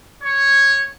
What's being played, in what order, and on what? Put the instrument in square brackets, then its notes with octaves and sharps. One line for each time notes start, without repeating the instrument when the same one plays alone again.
[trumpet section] C#5